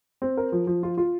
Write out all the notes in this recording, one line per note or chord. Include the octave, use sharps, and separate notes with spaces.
C4
A#4
F3
F3
F4
F4